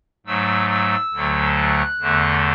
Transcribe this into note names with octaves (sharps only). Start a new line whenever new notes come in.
G#2 F#3 A3 E6
E6
D2 D3 F#3 A3
F#6
E2 D3 A3